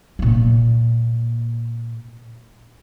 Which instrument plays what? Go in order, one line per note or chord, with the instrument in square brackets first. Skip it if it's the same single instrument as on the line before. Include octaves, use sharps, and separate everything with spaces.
[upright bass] A#2 A#3